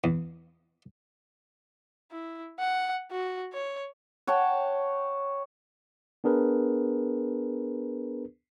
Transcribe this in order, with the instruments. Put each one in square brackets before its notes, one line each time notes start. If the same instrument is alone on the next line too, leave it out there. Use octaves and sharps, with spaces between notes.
[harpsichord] E2
[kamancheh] E4
F#5
F#4
C#5
[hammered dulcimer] C#5 F#5 G5 A5
[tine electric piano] B3 D4 G#4 A#4 B4